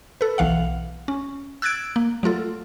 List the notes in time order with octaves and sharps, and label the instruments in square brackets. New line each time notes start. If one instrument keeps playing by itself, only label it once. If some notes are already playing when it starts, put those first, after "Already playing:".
[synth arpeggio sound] A4 B4
B1 E3 F5 F#5
C#4
E6 F#6 G#6 A6 D7
A#3
F#3 A3 F4 A4